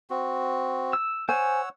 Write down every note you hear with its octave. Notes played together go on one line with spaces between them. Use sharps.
C4 F#4
E6
C5 C#5 F#5 G#5 E6